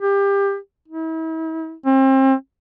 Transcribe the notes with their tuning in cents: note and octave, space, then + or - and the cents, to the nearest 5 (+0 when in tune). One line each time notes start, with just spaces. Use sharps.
G4 +25
E4 -40
C4 +35